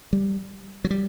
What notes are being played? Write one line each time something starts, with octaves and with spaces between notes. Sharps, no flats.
G3
F#3
G3